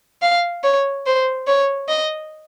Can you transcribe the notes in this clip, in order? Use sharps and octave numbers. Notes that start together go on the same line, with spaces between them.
F5
C#5
C5
C#5
D#5